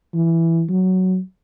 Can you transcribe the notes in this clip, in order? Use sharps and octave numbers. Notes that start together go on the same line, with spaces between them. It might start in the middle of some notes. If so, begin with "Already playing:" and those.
E3
F#3